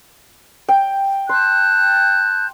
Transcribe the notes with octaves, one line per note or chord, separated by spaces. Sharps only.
G5
A5 C6 F#6 G6